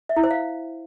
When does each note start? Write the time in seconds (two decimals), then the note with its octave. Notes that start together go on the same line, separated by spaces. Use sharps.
0.09 E5
0.16 E4
0.24 C5
0.31 F5